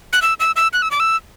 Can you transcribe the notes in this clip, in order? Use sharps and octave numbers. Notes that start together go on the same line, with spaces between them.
F#6
E6
E6
E6
F#6
E6
D6
E6